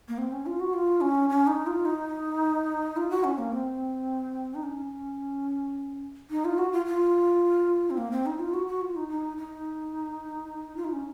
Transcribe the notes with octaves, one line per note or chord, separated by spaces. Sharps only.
A#3
C4
C#4
F4
F#4
F4
C#4
C#4
D#4
F4
D#4
F4
F#4
C#4
A#3
C4
D#4
C#4
D#4
F4
F#4
F4
F4
C4
A#3
C4
D#4
F4
F#4
F#4
F4
D#4
D#4
D#4
F4
D#4
C#4